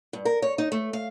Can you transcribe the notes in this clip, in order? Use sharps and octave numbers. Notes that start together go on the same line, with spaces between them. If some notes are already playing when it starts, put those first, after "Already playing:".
G2
A#4
C#5
D#4
A3
F5